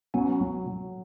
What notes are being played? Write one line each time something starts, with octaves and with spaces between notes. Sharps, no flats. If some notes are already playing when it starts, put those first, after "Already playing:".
F#3 B3 C#4
F#3
F#3